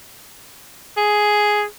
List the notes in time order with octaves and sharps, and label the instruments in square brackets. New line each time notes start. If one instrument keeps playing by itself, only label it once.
[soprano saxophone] G#4